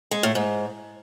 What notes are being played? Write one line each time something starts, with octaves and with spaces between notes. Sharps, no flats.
G#3
A2
G#2